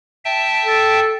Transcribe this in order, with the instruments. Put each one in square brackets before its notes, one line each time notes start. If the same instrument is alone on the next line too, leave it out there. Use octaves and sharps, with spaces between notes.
[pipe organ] E5 G5 A5
[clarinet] A4